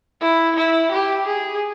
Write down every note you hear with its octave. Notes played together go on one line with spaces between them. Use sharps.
E4
E4
G4
G#4